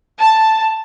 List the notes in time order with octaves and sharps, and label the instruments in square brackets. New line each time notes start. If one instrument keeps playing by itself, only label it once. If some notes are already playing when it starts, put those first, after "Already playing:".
[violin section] A5